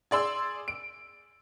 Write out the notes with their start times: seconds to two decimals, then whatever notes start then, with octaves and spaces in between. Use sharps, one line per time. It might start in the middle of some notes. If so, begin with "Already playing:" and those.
0.11 G#4 D5 C6 E6
0.68 D7